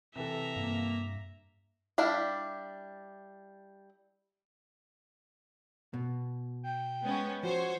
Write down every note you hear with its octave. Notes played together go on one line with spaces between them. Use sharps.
C3 E3 A4 E5 A#5
G2 A#3
G3 D4 E4 F5
B2
G5
G#3 B3 C#4
F3 F#4 C5 C#5